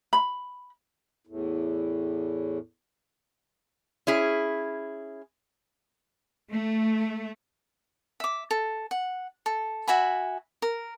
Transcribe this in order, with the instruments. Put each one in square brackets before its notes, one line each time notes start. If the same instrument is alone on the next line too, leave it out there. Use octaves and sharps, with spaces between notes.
[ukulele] B5
[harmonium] E2 A2
[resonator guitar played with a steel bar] C#4 E4 G#4
[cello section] A3
[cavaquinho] E5 D6
A4
F#5
A4
F#4 E5 G#5 B5
A#4